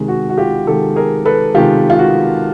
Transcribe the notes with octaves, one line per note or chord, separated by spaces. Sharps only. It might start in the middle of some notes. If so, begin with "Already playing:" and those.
Already playing: C3 D#3 G#3
F#4
F#4
F4 G4
C3 D#3 G#3 G4 A4
G#4 A#4
A4 B4
C3 D#3 G#3 F4 G4
F4
F#4